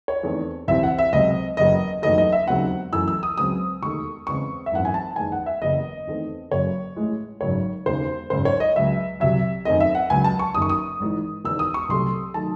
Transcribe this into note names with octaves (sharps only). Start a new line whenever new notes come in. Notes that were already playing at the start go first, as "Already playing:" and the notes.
C#5
E2 D#3 A3 C4
C2 C3 E3 C4 E5
F#5
E5
C#2 C3 F#3 C4 D#5
F#1 E2 C#3 F#3 D#5
F#1 E2 D#3 F#3 A3 D#5
D#5
E5
E1 D#2 C#3 F#3 C4 F#5
F#2 E3 A3 E6
E6
D#6
C#2 C#3 F#3 C4 D#6
E1 D#2 D#3 A3 C#6
E2 C#3 G#3 C4 C#6
E5
G#1 F#2 E3 A3 C4 F#5
G#5
A5
F#1 E2 D#3 G#3 G#5
F#5
E5
F#1 E2 C#3 D#5
E2 D#3 A3 C4
F#1 F#2 C#3 F#3 C#5
A1 A2 G#3
G#1 F#2 C#3 F#3 C#5
E1 D#2 C#3 C5
G#1 F#2 C#3 C5
C#5
D#5
C#2 C#3 F#3 E5
C2 C3 F#3 E5
F#2 D#3 A3 C4 D#5
E5
F#5
C#2 C#3 F#3 G#5
A5
C#6
F#1 F#2 D#3 D#6
C#6
D#6
G#1 G#2 E3
E1 E2 D#3 E6
D#6
C#6
C2 C3 F#3 A3 C6
D#3 F#3 A3 A5